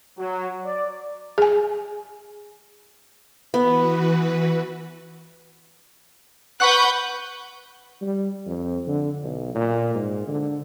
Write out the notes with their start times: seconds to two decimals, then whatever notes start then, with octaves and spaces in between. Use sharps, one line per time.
0.19 F#3
0.65 D5
1.38 G#4 G#5
3.54 E3 B3 F#4 B4
6.60 B4 F#5 B5 C#6 F#6 G6
8.02 G3
8.46 F2
8.87 D3
9.24 B1
9.55 A#2
9.95 G#2
10.28 D3